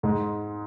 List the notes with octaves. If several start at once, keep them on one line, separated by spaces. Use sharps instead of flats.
G#2 G#3